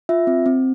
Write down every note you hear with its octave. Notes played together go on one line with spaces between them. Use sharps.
F4 E5
C4
C4